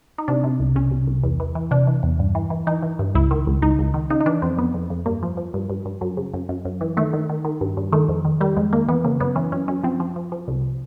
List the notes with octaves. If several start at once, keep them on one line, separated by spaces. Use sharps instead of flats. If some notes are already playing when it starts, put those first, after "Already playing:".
D#4
C3 D4
C3
C2
C2 C#4
C2
C2
E2
E3
E3
C3 D4
E3
E2
G2
E3
E3
E3 D#4
E3
G2
C#2 E4
D#3
C#2
C#2 D#4
C#2
D#3
C#3 D#4
D#4
E3 D4
F2 C4
F2 B3
F2
F2
G2 A#3
F3
F3
G2
G2
G2
F#2
C#3
F#2
F#2
F#2
E3
D#3 A3
D#3
D#3
D#3
G2
G2
D#3 A3
F2
D#3
D#3 G3
F2 G#3
D#3 A#3
E3 B3
C#3 A#3
F#2 B3
E3 C#4
F#2 C#4
F#2 C#4
F3 C4
F3
F3
F3
C2